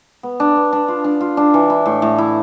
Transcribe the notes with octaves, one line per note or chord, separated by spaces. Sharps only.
B3
D4
B3
D4
F4
D4
F4
D4
E3
E4
A2
A2
E4